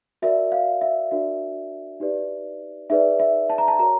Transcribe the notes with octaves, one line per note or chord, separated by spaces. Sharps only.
F#4 A#4 D5 E5
F5
E5
D4 F#4 A#4 D5 E5
D#4 G4 B4 D5
D#4 G#4 B4 D5 E5
E5
A5
A#5
A5
F#4 A#4 C#5 A#5